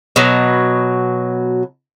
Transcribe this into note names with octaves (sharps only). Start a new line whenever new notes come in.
B2 F#3